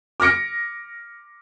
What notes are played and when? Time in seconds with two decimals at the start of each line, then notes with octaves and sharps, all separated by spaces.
0.20 D6 F6 A#6 C#7 D7